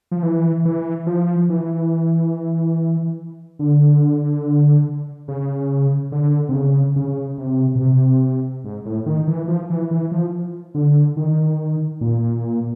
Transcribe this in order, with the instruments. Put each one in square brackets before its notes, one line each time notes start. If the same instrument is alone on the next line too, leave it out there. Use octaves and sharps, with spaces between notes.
[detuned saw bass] F3
E3
E3
F3
E3
D3
C#3
D3
C3
C#3
C#3
C3
B2
C3
G#2
A2
D#3
E3
F3
E3
E3
F3
D3
D#3
A#2